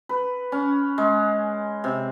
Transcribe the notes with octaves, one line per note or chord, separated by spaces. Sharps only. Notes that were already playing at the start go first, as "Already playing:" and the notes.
B4
C#4
G#3
C3